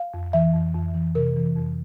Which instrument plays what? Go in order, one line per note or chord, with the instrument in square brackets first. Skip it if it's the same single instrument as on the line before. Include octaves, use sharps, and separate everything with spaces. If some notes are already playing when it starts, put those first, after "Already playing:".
Already playing: [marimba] F5
F2
E3 E5
F2
F2
E3
C3 A#4
E3
F2